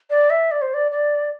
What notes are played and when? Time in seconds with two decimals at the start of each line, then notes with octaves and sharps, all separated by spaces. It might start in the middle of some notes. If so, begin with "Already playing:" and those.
0.10 D5
0.30 E5
0.51 D5
0.62 C5
0.74 D5
0.92 D5